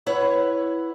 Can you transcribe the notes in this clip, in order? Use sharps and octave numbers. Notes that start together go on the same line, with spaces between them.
E4 B4 C#5 F#5